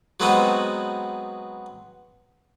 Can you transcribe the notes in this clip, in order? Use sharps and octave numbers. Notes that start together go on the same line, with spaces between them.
F#3 G#3 B3 C4 D#4 F#4